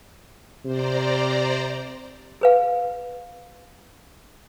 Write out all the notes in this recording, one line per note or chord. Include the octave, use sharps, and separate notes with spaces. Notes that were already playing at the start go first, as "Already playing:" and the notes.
C3 C5 D5 A#5
G#4 B4 F5